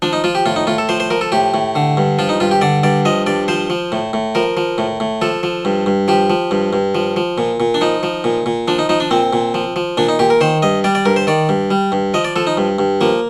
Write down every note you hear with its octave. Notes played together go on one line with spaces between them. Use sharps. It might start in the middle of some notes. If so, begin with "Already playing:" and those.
F3 D4
D#4
F3 F4
G4
A2 F4
D#4
A2 F4
A4
F3 C5
C5
F3 A#4
A4
A2 G4
A2
D3
G2
F3 F4
D#4
G2 F4
G4
D3 D5
G2 D5
F3 D#5
G2 D5
F3 C5
F3
A2
A2
F3 A#4
F3
A2
A2
F3 A4
F3
G2
G2
F3 G4
F3
G2
G2
F3
F3
A#2
A#2
D4
F3 D#4
F3
A#2
A#2
F3 D4
D#4
F3 D#4
D4
A#2 C4
A#2
F3
F3
A#2 D4
D#4
A#2 G4
A#4
D#3 C5
G2 D#5
G3 D5
D5
G2 A#4
C5
D#3 D5
G2
G3
G2
F3 D#5
D5
F3 A4
D#4
G2
G2
F3 A#3